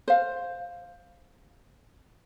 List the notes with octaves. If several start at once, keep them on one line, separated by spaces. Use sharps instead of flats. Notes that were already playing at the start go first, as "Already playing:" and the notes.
C5 F5